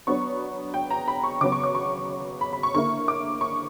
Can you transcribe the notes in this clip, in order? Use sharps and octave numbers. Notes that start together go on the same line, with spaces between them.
F#3 B3 D4 C#6
G5
A#5
B5
C#6
C#3 F#3 B3 D6
C#6
D6
C#6
B5
B5
C#6
D3 A#3 E4 C#6
D6
C#6